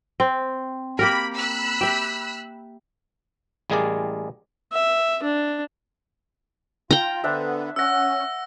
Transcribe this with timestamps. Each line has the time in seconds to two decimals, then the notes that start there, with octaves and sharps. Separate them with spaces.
0.20 C4
0.99 A#3 G4 A#4 B5
1.36 B5 E6 F#6
1.81 G4 E5
3.70 A1 G3 G#3 G#4 A#4 D5
4.72 E5
5.23 D4
6.91 F4 G5 A#5
7.24 D3 B3 D4 C5 E5
7.76 C#4 C#5 F#5 E6 A#6